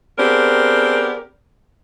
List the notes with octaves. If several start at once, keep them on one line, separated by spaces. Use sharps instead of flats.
B3 C4 D4 G4 G#4 A#4